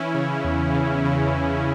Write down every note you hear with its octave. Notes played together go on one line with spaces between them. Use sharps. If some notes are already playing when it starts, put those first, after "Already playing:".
Already playing: E3 C#4 E4
C#3
E2
C#3
C#3
E2